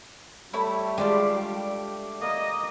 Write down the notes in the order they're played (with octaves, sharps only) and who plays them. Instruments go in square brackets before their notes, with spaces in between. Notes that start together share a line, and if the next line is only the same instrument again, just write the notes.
[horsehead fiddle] G3 [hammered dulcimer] A3 C#5 B5 [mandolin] E4
[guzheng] G#3 F4 [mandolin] D4 [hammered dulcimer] G4 D5 F5
[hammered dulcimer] A#3 [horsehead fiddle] D#5